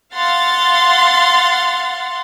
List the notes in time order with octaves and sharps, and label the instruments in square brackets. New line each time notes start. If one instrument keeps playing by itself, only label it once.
[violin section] F5 F#5 C6 A6